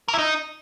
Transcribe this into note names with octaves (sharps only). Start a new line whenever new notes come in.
A#4
E4
D#4